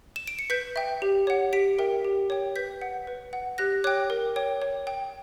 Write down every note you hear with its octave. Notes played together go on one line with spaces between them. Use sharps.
E7
D7
C#7
B4 G6 B6
E5 G5
G4
C#5 F#5
G4 B6 D7
A#4 E5 G5
G4
C#5 G5
B4 G6 B6
F#5
B4
F#5
G4 F#6 A#6
C#5 G5 D6 F#6
A#4
C#5 G5
C#5
G5